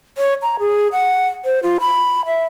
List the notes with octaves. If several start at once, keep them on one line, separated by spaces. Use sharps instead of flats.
C#5
A#5
G#4
F#5
C5
F4
B5
E5